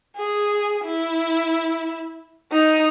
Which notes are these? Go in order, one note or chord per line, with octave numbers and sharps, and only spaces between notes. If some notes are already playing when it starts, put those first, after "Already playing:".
G#4
E4
D#4